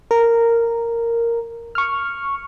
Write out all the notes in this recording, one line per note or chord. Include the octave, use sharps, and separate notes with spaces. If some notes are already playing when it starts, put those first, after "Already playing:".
A#4
C#6 F6